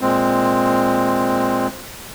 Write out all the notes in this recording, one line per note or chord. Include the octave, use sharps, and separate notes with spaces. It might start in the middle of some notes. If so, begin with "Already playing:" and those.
A#2 G#3 C4